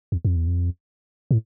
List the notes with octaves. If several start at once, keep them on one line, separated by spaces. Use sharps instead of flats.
E2
F2
E2
F2
A2